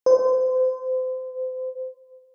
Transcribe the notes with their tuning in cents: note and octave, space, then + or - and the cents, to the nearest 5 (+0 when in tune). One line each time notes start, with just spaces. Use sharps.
C5 -30